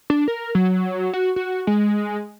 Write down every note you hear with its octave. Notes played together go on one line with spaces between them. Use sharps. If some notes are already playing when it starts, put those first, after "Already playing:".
D4
A#4
F#3
F#4
F#4
G#3